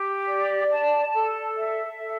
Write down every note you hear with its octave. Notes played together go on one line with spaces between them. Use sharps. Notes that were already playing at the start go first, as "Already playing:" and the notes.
Already playing: G4
D5
A5
A4
E5
A4